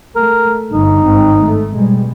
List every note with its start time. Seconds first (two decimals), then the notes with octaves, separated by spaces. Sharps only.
0.16 A3 A#4
0.71 G1 G2 D3 D#4
1.04 G#1 C4
1.44 G#2 A3
1.73 B2 G3 G#3